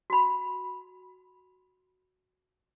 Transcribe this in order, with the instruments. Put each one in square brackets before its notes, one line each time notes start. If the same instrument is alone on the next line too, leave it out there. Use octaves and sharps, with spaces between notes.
[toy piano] F#4 B5